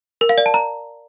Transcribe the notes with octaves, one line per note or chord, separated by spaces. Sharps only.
A#4
F5
D5
A5
A#5